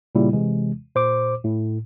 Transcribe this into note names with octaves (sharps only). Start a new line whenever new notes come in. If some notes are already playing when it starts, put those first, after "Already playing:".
A#2 C#3 G3 A#3 E4
C3 E3 G#3
A#2 C5 D6
A2